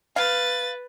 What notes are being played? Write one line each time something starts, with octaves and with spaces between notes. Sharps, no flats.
B4 F5 A6